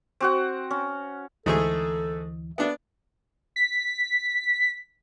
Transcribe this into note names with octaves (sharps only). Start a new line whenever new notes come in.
C4 F#4 F#5
C#4
D2 G#2 E3 A3 G#4 A4
B3 D4 E5
B6